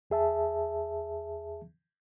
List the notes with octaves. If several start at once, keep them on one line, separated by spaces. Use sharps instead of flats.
E2 G#4 E5 A5